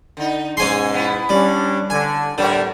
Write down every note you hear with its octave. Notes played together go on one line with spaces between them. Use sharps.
D3 D#4
G#2 B2 C#4 G#4 C#5 G#5 C6
B3 E4
G3 C#4 D4
D3 D4 G#5
A2 D3 G3 B3 A#4 C#5